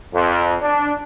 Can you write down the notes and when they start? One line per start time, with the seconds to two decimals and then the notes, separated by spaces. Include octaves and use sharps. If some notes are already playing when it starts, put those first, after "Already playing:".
0.13 F2
0.61 D4